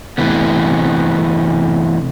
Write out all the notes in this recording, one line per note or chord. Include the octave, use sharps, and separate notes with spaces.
C3 E3 A3 B3